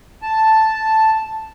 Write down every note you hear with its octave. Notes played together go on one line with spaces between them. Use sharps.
A5